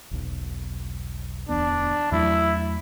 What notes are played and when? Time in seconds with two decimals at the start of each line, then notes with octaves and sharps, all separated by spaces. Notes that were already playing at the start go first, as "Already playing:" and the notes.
0.11 E1 B1
1.49 D1 E2 B3 D4
2.12 E2 F#3 A3 E4